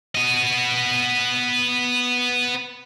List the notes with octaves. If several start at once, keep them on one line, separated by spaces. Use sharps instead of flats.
B3 D#5